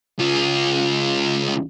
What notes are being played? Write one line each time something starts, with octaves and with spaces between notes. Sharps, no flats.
C#2 F4